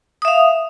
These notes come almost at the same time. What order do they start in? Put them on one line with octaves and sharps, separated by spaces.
D#6 E5 F5